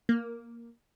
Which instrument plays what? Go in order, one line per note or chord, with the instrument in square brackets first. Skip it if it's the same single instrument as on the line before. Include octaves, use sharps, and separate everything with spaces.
[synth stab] A#3